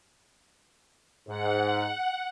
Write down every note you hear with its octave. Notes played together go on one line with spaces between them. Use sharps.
G#2 F#5